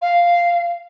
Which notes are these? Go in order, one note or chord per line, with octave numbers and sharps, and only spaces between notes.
F5